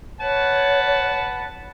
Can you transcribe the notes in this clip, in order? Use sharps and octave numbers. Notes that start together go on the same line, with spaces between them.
B4 C#5 F#5 A5